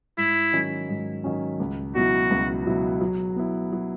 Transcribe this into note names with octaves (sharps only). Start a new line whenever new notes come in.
G#2 E4
D#3 F#3 C#4
G#2
D#3 F#3 C#4
C#2
B2 F#3 B3 E4 F#4
C#2
B2 F#3 B3 E4
F#3
B3 E4
F#3